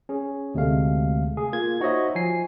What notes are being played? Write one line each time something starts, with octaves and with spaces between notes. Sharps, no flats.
C#4 G#4
D2 C3 G#3 A3 F5
G#4
A#3 F4 G#6
D#4 F#4 C5 C#5 D#5 E5
F3 G#5 C7